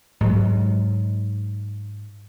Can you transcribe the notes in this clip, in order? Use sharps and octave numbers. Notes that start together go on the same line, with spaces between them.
G#2 F#3